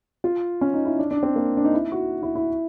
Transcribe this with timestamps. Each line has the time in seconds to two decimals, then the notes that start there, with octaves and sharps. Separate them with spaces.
0.24 F4
0.61 C#4
0.74 D#4
0.85 E4
0.99 D4
1.11 D4
1.23 C4
1.36 A#3
1.57 D4
1.65 D#4
1.74 E4
1.92 F#4
2.23 E4
2.36 E4